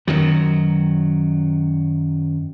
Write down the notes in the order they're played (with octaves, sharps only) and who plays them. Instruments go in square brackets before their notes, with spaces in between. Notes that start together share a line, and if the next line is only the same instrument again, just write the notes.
[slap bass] F#2 D#3 F#3